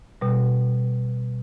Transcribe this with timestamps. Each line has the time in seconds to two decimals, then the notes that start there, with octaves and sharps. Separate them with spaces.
0.21 B2 G3